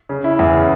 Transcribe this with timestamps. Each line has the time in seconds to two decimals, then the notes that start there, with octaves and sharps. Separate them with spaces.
0.09 C#3
0.24 E4
0.39 E2
0.53 C#3